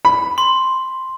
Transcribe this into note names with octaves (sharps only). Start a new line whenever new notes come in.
B5
C6